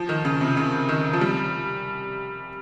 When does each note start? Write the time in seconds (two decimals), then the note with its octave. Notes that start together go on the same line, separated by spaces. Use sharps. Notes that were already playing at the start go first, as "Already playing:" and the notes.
Already playing: F3
0.09 D#3
0.25 C#3
0.41 C3
0.57 C#3
0.89 D#3
1.13 F3
1.21 G3